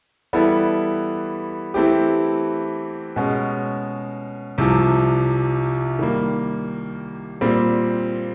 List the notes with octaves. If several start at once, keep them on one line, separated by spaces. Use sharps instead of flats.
E3 G3 B3 E4 A4
E3 A3 C4 E4 G4
B2 G#3 C#4
C2 C3 F3
D#3 G3 A#3
A#2 G3 C4